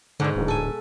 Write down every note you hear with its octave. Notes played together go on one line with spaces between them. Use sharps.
G#2 B2 D3
D1
A4 G#5